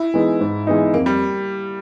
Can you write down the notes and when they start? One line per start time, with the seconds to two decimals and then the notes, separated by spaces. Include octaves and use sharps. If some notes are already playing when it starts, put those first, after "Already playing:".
Already playing: E4
0.14 E3 G#3 B3 D#4
0.41 G#2
0.67 E3 G#3 B3 D#4
0.93 F2 A#3
1.06 G3